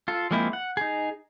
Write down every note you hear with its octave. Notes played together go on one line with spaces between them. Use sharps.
F4 A4
F3 G#3 A#3 C4 E4
F#5
D#4 G#4